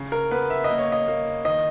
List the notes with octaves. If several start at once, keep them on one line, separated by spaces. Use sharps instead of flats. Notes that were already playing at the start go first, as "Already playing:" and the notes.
Already playing: C#3
A#4
B3 B4
E5
A#3 D#5
C#5
D#5
A#3
D#3 D#5